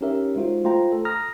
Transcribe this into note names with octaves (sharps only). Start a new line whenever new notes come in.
C#4 D#4 G4 A#4 C#5 E5
G#3 D#4 F4 F#4 C5
A3 F4 C5 G5 A#5
A4
A#5 D#6 F6 A#6